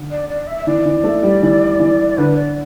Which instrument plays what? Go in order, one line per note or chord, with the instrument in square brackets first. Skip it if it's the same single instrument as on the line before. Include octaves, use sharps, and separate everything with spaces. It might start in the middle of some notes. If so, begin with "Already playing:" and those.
Already playing: [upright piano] D3
[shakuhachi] D5
D5
E5
E5
[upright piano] E3 [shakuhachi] D5
[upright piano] E3
A3
G3
E3
E3
[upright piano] D3 [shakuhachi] B4
[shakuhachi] D5